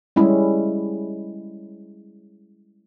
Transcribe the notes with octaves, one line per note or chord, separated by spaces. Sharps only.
G3 G#3 C#4 E4